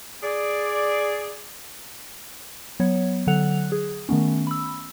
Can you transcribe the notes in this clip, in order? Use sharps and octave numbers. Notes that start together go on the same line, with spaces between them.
G#4 D5
F#3 B3 C#5
D3 F#3 A4 F#5 F#6 F7
G#4
D#3 A3 B3 C#4
B5 E6